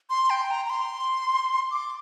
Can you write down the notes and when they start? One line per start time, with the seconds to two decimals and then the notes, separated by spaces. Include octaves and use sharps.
0.10 C6
0.30 G5
0.51 A#5
0.66 A#5
0.70 C6
1.71 D6